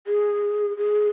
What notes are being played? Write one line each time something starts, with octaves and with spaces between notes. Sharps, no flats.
G#4
G#4